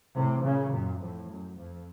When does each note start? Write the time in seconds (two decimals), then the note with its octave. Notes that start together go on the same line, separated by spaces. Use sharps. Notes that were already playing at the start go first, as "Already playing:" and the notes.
0.15 A2 C3
0.44 A#2 C#3
0.72 F#2 A#2
1.01 F2 A2
1.30 F#2
1.58 F2